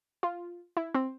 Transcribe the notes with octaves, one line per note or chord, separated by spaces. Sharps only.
F4
E4
C4